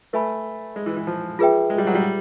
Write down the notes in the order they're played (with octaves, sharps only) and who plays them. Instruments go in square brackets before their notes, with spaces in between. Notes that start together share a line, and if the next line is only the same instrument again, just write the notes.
[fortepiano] A3 [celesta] B4 E5 G#5 B5
[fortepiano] G#3
E3
E3
F3
[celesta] F4 G#4 B4 E5 G5
[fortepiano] G#3
G3
F#3
G3